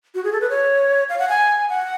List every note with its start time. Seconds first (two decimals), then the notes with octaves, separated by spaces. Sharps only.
0.15 F#4
0.24 G#4
0.33 A4
0.41 B4
0.50 C#5
1.09 F5
1.19 F#5
1.29 G#5
1.69 F#5